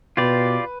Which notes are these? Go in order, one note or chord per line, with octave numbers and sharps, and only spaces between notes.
B2 F4 G4 B4 D5